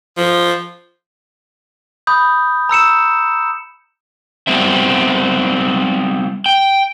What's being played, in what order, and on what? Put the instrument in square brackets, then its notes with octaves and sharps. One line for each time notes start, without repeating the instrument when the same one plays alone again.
[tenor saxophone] F3
[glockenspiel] B5 D#6 G6
A#5 E6 C#7 E7
[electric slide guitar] G3 B3 C4 E5
G5